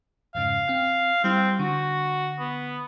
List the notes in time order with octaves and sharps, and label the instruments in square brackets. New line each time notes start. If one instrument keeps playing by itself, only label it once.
[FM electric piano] F2 G#2 C#3 [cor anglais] F5
[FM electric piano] C4 G5 F6
[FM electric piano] G3 E4 [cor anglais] C4
[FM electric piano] D3 [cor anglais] F#4
[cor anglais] B3